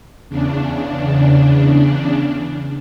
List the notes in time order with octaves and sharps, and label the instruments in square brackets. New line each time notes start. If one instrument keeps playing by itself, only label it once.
[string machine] E2 C#3 D4